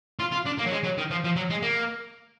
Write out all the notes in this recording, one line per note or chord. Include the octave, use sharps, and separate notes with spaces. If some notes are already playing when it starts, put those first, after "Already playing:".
F4
F4
D4
A#3
F#3
G#3
F#3
D#3
F3
F3
F#3
G#3
A#3